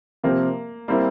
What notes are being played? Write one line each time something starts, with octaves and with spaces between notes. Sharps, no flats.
C3 F3 A#3 C4 G4 A#4
G3 A#3 C4 E4